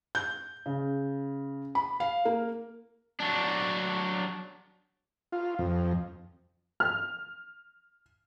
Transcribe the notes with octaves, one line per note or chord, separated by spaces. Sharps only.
G6
C#3
B5
F5
A#3
F#3 D4
F4
F2
F6